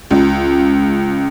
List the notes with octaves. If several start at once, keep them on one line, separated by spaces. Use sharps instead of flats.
C#2